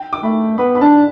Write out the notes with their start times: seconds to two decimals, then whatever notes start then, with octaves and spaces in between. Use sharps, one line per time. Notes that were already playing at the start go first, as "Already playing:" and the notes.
Already playing: G5
0.13 D6
0.23 A3 B5
0.58 B3 B5
0.75 B5
0.81 D4 A5